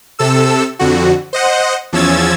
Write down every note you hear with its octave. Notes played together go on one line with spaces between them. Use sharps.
C3 A4 E6
F2 D3 F#4
C5 D#5 F#5
E2 F3 C#4 E6 G#6 A6